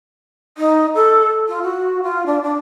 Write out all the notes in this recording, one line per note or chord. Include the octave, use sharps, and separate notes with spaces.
D#4
A4
F4
F#4
F4
D4
D4